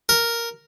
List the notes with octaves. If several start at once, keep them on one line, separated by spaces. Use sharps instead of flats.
A#4